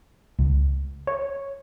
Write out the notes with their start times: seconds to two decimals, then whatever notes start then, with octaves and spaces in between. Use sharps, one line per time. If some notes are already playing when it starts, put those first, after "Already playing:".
0.39 C#2
1.07 C#5